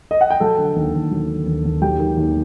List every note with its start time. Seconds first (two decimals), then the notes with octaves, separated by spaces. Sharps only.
0.11 D#5
0.21 F#5
0.30 G5
0.40 F#3 A4 A5
0.58 D3
0.76 D#2
0.94 D#2
1.11 F#3
1.29 D3
1.46 D#2
1.64 D#2
1.82 F#3 G4 G5
1.99 D#3
2.17 D#2